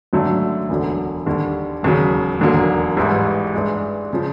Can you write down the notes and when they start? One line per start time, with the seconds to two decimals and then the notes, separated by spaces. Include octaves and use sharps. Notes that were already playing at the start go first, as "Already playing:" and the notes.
0.13 G#1 F#2 D3 F#3 A3
0.69 E1 D2 D3 F#3
1.26 D#2 D3 G3
1.83 E1 D#2 C#3 F#3
2.40 E1 D#2 D3 F#3 A#3
2.97 A1 G#2 E3 G3
3.54 G2 E3 G#3
4.13 C#3 F3